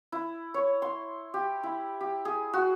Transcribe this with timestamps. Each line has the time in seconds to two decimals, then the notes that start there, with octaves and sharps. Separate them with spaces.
0.12 E4
0.54 C#5
0.82 C6
1.34 G4
1.63 E4
2.01 G4
2.25 G#4
2.53 F#4